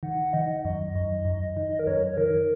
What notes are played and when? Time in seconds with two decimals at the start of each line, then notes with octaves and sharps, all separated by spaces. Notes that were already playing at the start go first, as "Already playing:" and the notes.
0.03 D#3 F#5
0.33 D#3 D#5
0.65 F#2 D#5
0.95 F#2
1.25 F#2
1.57 D#3
1.79 A#4
1.87 F#2 C#5
2.17 D#3 A#4